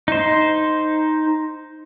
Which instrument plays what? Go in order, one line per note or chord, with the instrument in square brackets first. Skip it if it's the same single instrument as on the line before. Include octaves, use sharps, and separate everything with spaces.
[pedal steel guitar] D#4 C5